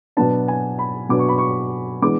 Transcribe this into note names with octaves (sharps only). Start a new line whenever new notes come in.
B2 F#3 B3 D4 A5
G#5
B5
B2 F#3 B3 D4 D6
C#6
B5
C#6
E3 G#3 B3 D4 D6